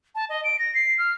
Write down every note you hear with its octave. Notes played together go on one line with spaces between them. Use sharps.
A5
D#5
D7
A#6
C7
F6